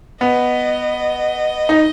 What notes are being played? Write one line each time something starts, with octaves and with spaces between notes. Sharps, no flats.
B3 D#5
D#4